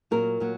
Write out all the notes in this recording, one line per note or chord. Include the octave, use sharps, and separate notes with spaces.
A#2 F#3 A#4
A#2 F#3